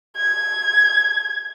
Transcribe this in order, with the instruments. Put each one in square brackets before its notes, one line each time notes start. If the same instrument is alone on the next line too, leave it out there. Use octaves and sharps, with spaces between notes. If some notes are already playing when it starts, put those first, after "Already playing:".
[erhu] G#6